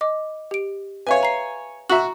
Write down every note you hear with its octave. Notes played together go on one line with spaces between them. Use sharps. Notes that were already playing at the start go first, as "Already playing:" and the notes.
D#5 D6
G4 D7
B4 C#5 E5 F5 G#5
A#5 C7
F#4 E5 A#5 C#6 F#7